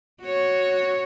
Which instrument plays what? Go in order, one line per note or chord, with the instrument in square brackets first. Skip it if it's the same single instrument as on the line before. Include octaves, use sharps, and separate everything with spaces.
[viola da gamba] F#4 C#5